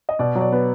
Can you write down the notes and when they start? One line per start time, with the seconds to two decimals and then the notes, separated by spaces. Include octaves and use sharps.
0.09 D#5
0.19 B2 D5
0.35 F#3
0.41 D5
0.52 B3